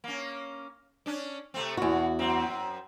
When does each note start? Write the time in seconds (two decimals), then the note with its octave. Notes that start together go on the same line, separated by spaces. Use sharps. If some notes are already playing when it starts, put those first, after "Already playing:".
0.04 A#3 C#4
1.06 C#4 D4
1.54 C3 A3 C4
1.77 E2 B2 F#4
2.19 F#2 C4